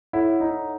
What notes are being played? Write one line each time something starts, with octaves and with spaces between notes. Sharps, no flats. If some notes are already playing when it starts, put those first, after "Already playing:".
E4 A4 C#5 F#5
D#4